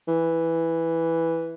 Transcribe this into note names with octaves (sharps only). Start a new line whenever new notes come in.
E3